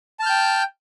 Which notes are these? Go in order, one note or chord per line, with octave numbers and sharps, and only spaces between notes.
G5 A5 F6 G6